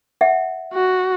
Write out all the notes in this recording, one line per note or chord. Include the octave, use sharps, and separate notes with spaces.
E5 F#5
F#4